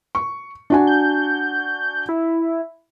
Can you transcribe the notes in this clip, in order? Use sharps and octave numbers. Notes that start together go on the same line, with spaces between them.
C#6
D4 F#4 G#5
G6
E4